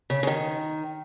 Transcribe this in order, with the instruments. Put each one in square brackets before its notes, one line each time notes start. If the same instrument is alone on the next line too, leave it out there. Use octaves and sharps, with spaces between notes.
[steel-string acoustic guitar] C#3
C#3
D#3